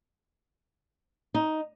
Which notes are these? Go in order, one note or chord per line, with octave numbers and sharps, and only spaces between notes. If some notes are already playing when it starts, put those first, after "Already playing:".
D#4